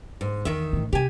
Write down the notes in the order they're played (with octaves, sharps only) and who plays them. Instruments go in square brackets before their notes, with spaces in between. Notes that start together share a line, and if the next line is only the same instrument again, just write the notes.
[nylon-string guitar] G#2
[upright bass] E2 [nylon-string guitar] D#3 E5
[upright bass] A2 E3
[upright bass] C3 [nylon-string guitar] G4 G#5